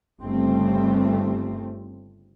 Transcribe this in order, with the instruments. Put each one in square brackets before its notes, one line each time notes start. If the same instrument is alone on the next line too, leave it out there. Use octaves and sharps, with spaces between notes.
[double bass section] G1 C#3 G3 A3 C4